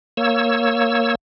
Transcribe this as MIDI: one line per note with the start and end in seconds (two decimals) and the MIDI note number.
0.17 1.15 58
0.17 1.15 73
0.17 1.15 88